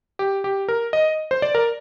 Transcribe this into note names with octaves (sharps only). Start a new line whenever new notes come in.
G4
G4
A#4
D#5
C5
D5
A#4